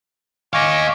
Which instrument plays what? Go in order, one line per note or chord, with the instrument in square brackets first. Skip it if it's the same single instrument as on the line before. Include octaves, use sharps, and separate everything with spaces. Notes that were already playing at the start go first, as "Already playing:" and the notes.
[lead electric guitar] D#5 F5 [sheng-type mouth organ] G#5 C#6 D6